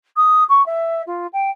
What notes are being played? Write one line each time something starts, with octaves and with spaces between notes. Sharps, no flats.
D#6
C#6
E5
F4
G5